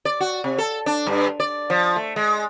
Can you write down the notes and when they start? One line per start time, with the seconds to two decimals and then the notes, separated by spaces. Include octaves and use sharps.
0.05 D5
0.20 F#4
0.44 C3
0.58 A4
0.86 D4
1.07 G2
1.40 D5
1.70 F3
1.96 A3
2.16 G#3